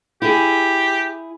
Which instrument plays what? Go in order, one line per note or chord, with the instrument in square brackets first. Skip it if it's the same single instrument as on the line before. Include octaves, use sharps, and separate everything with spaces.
[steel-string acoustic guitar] E4 G#4 [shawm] G4